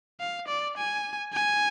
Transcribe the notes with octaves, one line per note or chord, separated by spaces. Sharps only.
F5
D5
G#5
G#5